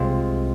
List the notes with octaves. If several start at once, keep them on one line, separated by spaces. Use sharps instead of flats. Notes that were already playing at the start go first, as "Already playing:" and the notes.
Already playing: C2 C3 G#3 C4 F4